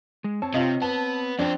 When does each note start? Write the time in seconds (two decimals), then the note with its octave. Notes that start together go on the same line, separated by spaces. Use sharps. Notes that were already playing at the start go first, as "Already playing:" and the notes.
0.24 G#3
0.42 C4 C#5 A5
0.54 C3 F4 D#5
0.82 B3 A5
1.39 F2 C4 D4